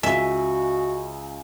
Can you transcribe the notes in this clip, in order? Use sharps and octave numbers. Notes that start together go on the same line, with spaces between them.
C#2 F#4 E5 G#5